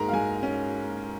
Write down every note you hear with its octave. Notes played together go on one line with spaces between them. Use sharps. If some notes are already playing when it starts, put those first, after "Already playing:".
Already playing: G#2 G#3 A#4 A#5
F5
G#2 G#5
C#4